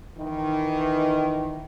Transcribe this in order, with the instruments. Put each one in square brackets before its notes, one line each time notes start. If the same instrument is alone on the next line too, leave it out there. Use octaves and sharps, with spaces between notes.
[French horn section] D#3 E3 D#4